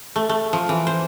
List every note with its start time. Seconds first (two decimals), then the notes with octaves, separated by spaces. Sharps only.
0.16 A3
0.29 A3
0.53 F3
0.69 E3
0.87 C5